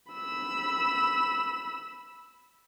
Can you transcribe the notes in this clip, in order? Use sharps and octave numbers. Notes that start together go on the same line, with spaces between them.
B5 E6